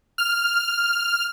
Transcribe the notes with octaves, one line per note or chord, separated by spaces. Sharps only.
F6